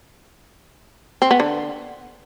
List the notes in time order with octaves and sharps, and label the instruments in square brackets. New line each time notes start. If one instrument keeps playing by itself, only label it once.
[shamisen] C4
B3
D3